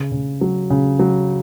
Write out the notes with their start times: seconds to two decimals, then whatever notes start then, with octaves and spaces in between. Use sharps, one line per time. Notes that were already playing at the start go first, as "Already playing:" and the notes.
Already playing: C#3
0.12 C#3
0.41 F#3
0.70 C#3
0.99 F#3